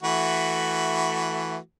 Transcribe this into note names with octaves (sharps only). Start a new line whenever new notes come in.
E3 A3 F#4